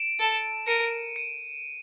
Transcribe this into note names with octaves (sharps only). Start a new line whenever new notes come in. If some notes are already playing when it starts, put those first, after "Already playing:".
Already playing: D7 E7
A4
A#4 C#7 D#7
C#7 D#7